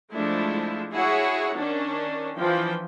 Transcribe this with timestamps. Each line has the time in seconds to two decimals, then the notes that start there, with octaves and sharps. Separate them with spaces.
0.12 F3 G#3 A3 D4 E4
0.93 E4 F#4 G#4 C#5 F#5
1.54 D#3 C#4 D4
2.38 E3 F3 G5